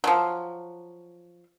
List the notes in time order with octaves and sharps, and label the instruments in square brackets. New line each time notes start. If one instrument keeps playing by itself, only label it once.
[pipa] F3 F#3